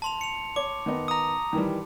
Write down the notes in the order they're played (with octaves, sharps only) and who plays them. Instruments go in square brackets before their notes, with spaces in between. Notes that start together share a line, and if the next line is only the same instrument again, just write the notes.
[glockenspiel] A5 C6 F7
C#7 F7
[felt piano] C#5 [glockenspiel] D6
[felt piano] D#3 B3 D#4
[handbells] A#5 D#6
[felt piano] D#3 E3 G3